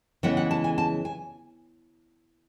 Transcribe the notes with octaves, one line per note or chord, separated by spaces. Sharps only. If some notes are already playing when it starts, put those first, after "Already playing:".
C#3 E3 G#3 B3 F#5
F#5
A5
G#5
A5
G#5